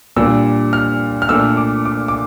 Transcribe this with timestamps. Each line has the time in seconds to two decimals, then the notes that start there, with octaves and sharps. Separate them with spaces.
0.16 A#2 G3 D4 E6
0.73 F6
1.22 F6
1.29 A#2 A3 D4 E6
1.57 D6
1.85 D6
2.08 D6